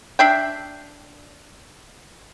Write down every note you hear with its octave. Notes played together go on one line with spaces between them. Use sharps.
D4 E5 G5